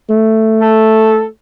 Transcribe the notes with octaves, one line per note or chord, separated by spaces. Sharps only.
A3
A4